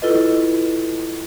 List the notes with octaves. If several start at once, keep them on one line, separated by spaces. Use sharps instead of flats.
E4 F4 A4 B4 D#5